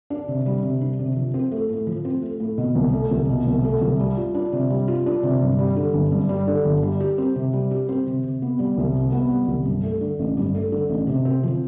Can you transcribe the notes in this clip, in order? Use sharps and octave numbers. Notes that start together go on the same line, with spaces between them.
D4
C3
G3
C3
D4
C3
F3
C4
A3
A2
F3
C4
A3
A2
B2
C2
A3
C2
B2
C2
A3
C2
G3
F4
D4
C3
G3
F4
D4
C3
G2
G3
D3
G1
G2
G3
D3
G1
G3
G4
C4
C3
G3
G4
C4
C3
C3
B3
G3
C2
C3
B3
G3
C2
G2
A3
D3
A1
G2
A3
D3
A1
C3
C4
F3